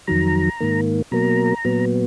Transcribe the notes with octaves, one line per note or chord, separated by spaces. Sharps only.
F2 D#3 F#3 A#5
G#2 D#3 A#3
B2 F#3 A#3 A#5
A#2 F#3 B3